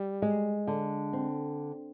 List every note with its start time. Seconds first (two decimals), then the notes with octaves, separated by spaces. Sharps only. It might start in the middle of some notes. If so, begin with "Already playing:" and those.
Already playing: G3
0.22 G#3
0.67 D3
1.13 C4